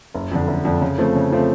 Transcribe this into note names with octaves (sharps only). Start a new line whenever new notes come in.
F#1
F2 D3
F#1
F2 D3
C#3
F3 A3 C4
C#3
F3 A3 C4